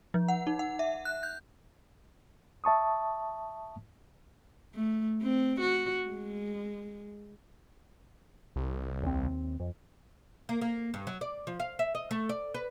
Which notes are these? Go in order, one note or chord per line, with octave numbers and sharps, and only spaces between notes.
F3
F#5
D#4
F#5
E5
F#6
G6
E5 A5 C#6 D#6
A3
C4
F#4
G#3
C2
D#2 C4
F2
A#3
A#3
G2
F#3
D5
F3
F5
E5
D#5
A3
D5
B4